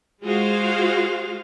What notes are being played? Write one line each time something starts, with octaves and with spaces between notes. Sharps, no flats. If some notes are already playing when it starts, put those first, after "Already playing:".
G#3 F4 F#4 G#4 C5 F5